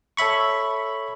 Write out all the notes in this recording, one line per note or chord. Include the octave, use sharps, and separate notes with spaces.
A4 C#5 E5 B5 C#6